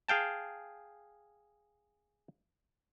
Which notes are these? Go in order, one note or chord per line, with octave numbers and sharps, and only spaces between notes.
G#4 F5 G5 A5